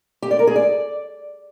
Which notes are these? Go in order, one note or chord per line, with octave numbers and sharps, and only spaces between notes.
G4
D5
A#4
G#4
D5